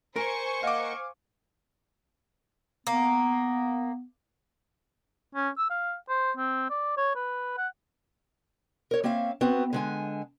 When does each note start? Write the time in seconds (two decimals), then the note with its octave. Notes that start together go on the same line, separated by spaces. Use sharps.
0.16 A#4 C5 G#5 C#6
0.63 A#3 D#5 F5 F#5 D6
2.87 A#3 B3
5.35 C#4
5.58 E6
5.70 F5
6.10 C5
6.37 C4
6.70 D5
6.98 C#5
7.16 B4
7.58 F#5
8.91 A#4 C#5
9.04 A#3 C4 C#4 E5 F5
9.41 B3 C4 F#4
9.73 D3 G#3 G#5